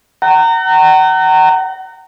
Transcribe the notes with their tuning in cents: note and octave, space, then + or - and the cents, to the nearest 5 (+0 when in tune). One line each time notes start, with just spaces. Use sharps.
F#5 +40 A#5 -25